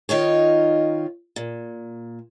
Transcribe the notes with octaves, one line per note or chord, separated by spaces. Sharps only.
D#3 D#4 F4 C#5
A#2